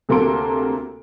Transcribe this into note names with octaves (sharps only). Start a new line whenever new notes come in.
D2 C3 A#3 A4 C6 D7